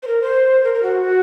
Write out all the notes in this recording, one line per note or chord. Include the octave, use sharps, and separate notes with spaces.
C5
A#4
C5
A#4
A#4
F#4